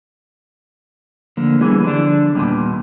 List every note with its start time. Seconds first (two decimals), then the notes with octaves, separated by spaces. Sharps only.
1.37 D3 F3 A#3
1.61 E3 G3 B3 G#4
1.84 D3 F3 D4
2.35 D#2 A#2 G3 B3